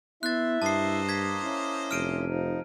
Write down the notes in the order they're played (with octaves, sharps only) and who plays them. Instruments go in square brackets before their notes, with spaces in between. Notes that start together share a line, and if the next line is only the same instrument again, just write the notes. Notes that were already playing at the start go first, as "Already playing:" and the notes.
[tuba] B3 [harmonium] E4 E5 [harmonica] C6 [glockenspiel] F#6 A6
[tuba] G2 [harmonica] A#3 C5 D#5 [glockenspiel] A5 C7
[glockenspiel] G#6 B6
[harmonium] C#4 E4
[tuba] F1 [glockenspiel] F6 D7 D#7
[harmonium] F3 D#4